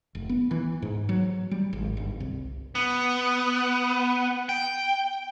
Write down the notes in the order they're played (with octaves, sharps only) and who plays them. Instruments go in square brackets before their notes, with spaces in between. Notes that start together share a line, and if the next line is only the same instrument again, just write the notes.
[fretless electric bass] F1
B3
E3
G#2
F#3
G3
G#1
G1
C2
[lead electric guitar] B3
G5